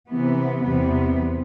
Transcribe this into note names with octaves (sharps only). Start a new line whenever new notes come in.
C3 E3 B3
E2 C3 G3 B3